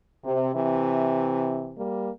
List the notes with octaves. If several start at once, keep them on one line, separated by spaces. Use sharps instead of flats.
C3
C3 E3
G3 A#3